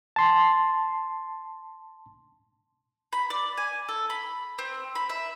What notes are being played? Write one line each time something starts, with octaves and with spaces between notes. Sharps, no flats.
A5 C6
B5
D5
G#5
A4
B5
C4
B5
E5